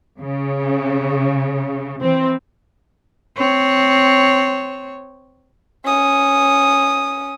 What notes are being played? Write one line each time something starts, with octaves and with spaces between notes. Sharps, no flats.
C#3
E3 C4
C4 C#5
C#4 D#6